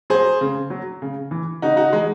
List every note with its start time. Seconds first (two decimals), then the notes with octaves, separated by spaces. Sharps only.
0.10 F#3 G#4 C5
0.41 C#3
0.70 F#3
1.02 C#3
1.31 E3
1.62 C#3 D#4 F#4
1.77 D#4 F#4
1.93 E3 G#3